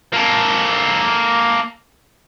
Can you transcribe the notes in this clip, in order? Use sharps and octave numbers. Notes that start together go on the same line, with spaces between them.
A#3 A4